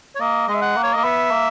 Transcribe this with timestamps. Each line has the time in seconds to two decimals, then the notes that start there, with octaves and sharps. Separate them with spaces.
0.15 C#5
0.20 A#3 D#5
0.48 G#3 D#5
0.55 E5
0.62 F#5
0.76 A#3
0.83 C#5
0.93 A#3 D#5
1.04 B3 E5
1.31 A#3